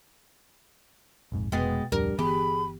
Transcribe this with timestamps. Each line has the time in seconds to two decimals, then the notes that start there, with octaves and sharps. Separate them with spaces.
1.32 A#1 F2 G#2
1.52 F1 B2 G#3 B3 G5 A6
1.92 D1 F2 G3 D4 G4 A#4
2.19 G1 E3 B3 G4 G#4 B5